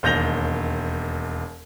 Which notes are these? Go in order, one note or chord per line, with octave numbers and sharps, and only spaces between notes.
E1 D#2 G6 A#6 F7 G7